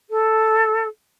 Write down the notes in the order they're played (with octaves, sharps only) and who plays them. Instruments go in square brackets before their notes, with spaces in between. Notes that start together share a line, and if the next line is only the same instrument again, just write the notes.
[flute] A4